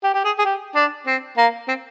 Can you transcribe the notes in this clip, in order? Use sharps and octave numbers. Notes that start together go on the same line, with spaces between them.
G4
G4
G#4
G#4
G4
D4
C4
A#3
C4